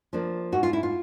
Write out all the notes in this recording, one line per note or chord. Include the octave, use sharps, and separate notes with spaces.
F3 A#3 D4
G#2 F#4
F4
E4
F4